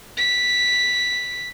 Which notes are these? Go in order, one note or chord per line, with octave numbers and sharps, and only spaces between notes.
B6